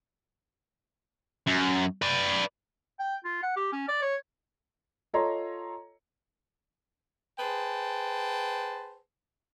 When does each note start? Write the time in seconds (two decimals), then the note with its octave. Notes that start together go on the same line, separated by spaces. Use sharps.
1.47 F#2
2.02 B4 D5
3.00 G5
3.25 F4
3.43 F#5
3.57 G4
3.73 C#4
3.89 D5
4.02 C#5
5.13 F4 A4 C#5 D#5 A#5 C6
7.39 G#4 B4 C5 G5 A5